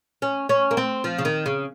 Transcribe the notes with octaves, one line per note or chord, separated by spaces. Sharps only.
C#4
C#4
A#3
C4
F3
C#3
D#3
C#3